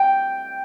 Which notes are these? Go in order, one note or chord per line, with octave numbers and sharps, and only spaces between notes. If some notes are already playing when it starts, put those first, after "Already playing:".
Already playing: G5